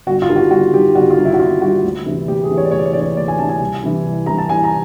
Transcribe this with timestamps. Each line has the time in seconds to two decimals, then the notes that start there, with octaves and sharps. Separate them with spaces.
0.07 G1 F#4
0.22 F4
0.29 G2 D#3 G3
0.36 F#4
0.51 G1 F#4
0.73 G2 D#3 G3 G4
0.95 G1 F#4
1.10 F4
1.18 G2 D#3 G3
1.25 E4
1.34 F#4
1.40 G1 F4
1.61 G2 D#3 G3 F#4
1.84 D2
2.06 C3 E3
2.28 D2 G4
2.43 G#4
2.50 C3 E3
2.57 C#5
2.65 D5
2.71 D2 C#5
2.79 D5
2.86 C#5
2.93 C3 E3 D5
3.01 C#5
3.17 D2 D5
3.28 G#5
3.39 C3 A5
3.42 E3
3.49 G#5
3.60 C2
3.83 C3 E3 G3
4.05 C2
4.26 C3 E3 G3 A#5
4.38 A5
4.49 C2 G#5
4.64 A#5